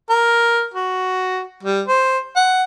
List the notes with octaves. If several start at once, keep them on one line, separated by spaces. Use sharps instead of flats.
A#4
F#4
G3
C5
F#5